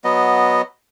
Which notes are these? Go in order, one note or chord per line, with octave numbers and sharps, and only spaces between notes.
F#3 B3 D#5